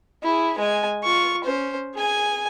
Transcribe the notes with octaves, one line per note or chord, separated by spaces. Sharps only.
E4 G#4
G#3 G#5
F4 C#6
C#4 C5
G#4 G#5